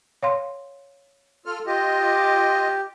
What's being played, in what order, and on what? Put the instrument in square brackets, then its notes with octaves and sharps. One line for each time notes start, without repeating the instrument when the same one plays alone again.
[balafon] C#5 F5 C6
[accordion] F4 A4 F6
[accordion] F4 D#5 [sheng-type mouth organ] G4